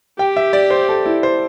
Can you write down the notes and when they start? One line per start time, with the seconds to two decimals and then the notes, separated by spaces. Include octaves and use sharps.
0.18 G4 G5
0.36 E5
0.53 D5
0.70 C5
0.89 A4
1.06 E4
1.23 C5